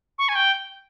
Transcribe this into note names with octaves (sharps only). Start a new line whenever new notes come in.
C#6
G#5
G5